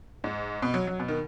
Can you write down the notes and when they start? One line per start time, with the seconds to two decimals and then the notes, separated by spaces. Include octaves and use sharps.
0.24 G#2
0.62 B2
0.74 F#3
0.87 F#3
0.99 B2
1.08 D#3